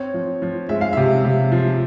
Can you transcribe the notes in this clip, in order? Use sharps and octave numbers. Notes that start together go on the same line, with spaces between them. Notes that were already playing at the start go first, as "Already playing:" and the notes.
Already playing: C4 C#5
F3
F3
G#3 E5
F5
C3 E5
C3
F3